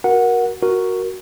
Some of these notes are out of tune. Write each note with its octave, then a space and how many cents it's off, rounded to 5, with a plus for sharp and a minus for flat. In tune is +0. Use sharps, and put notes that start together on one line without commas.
F#4 +0 A#4 +15 F#5 -10
F#4 +0 A#4 +0